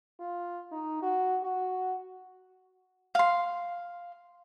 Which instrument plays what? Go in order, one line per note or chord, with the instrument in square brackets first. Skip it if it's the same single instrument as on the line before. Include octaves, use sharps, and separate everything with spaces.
[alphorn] F4
D#4
F#4
F#4
[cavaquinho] F5 C6